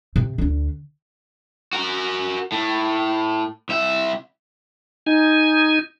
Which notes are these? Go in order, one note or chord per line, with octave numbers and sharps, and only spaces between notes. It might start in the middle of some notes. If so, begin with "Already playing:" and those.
C3
D2 D4
F#4 A#4
A2
C2 E5
D#4 G#5